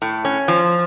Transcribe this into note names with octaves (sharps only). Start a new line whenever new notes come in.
A2
C#4
F3